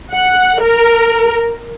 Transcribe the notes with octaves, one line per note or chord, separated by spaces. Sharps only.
F#5
A#4